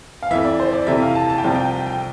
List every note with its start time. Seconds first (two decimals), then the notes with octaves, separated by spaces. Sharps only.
0.23 F5
0.31 F2 E3 E5
0.44 D5
0.60 C5
0.73 D5
0.87 F2 C3 E3 E5
1.02 F5
1.15 A5
1.30 A5
1.38 G5
1.44 C2 C3 F3 F5
1.55 G5
1.71 G5
1.86 G5